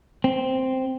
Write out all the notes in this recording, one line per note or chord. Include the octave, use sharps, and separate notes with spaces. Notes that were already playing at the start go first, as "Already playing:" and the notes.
C4